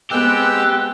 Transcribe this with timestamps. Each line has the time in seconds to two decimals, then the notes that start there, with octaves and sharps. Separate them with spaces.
0.11 G#3 B3 C4 G4 G5 E6 F#6